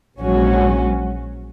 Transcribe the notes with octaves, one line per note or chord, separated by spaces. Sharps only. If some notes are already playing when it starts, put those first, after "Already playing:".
A#1 G#2 F#3 C#4 F#4